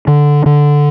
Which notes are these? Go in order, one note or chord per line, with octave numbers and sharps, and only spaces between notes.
D3
D3